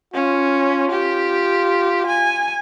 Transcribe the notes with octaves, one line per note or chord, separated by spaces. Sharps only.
C#4 F4
G4
G#5